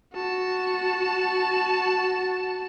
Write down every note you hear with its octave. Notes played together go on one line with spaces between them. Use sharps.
F#4 A5